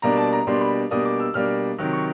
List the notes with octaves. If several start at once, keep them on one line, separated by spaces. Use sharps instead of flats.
B2 G3 A#3 D4 A#5
A5
A#5
B2 G3 A#3 D4 C6
B5
B2 G3 A#3 D4 D#6
D6
E6
B2 G3 A#3 D4 F6
C3 D#3 F#3
C#6